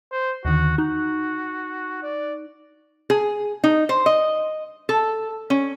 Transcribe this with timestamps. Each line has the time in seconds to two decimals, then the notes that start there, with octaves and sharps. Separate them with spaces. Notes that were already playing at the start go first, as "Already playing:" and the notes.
0.12 C5
0.45 D#2 D3 D#3 F#4
0.78 D#4 F#4 F#6
2.03 D5
3.10 G#4
3.64 D#4
3.89 C5
4.06 D#5
4.89 A4
5.50 C#4